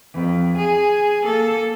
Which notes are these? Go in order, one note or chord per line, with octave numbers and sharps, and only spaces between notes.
F2
G#4
A#3 A4